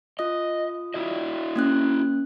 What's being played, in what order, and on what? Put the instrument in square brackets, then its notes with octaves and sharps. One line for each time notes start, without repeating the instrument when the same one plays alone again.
[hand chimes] F4 D#6 [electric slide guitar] D#5
[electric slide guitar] E4 F#4 D#5
[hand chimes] A#3 C#4 F#6